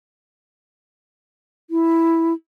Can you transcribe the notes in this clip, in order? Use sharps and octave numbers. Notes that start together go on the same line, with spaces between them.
E4